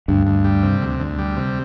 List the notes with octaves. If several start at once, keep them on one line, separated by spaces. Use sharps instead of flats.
D2 G2
D2
G3
C3
D2
D2
G3
C3